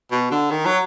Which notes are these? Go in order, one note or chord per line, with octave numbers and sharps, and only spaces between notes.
B2
D3
D#3
F#3